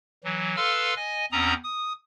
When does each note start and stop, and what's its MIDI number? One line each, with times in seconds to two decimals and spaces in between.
0.24 0.56 52
0.24 0.56 54
0.57 0.94 69
0.57 0.94 71
0.57 0.94 77
0.57 0.94 84
0.57 0.94 88
0.57 0.94 89
0.96 1.25 75
0.96 1.25 80
1.32 1.54 40
1.32 1.54 60
1.32 1.54 61
1.32 1.54 82
1.32 1.54 87
1.64 1.93 87